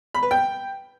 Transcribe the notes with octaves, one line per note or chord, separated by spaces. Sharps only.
B5
B4
G5